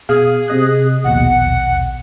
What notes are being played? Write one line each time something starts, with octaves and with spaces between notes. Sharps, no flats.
B2 G#4 F5
C3 D#5 F#6
A#1 D#2 B2 F#5